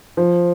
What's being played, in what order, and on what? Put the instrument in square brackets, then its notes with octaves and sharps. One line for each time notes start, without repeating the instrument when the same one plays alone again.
[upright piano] F3